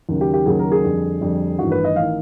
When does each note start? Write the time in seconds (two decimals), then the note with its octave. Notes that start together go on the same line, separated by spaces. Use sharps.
0.09 D#2 C#3 F#3
0.21 G4
0.34 G4
0.46 D#2 C#3 F#3 G#4
0.59 A#4
0.72 G#4
0.84 F2 D3 G3
1.21 F2 D3 G3
1.59 A1 G2 D#3 F#4
1.72 B4
1.85 D#5
1.96 A1 D#3 F5